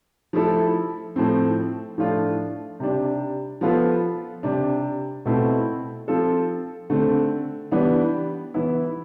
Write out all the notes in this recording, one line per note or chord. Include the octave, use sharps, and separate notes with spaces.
F3 A3 E4 A4
A2 F3 A3 C4
A2 F3 A3 D4 F4
C3 G3 D4
F3 B3 F4 A4
C3 G3 D4
B2 A3 C4 E4
F3 C4 F4 A4
D3 A3 C4
E3 G3 B3 D4
E3 B3 E4